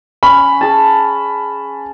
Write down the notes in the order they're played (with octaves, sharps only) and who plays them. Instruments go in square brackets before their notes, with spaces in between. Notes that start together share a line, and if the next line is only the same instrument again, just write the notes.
[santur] C#4 [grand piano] B5
[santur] G#4 A5